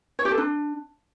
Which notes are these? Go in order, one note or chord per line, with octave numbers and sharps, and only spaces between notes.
C#5
G4
A4
D4